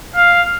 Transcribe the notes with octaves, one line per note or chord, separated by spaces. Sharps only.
F5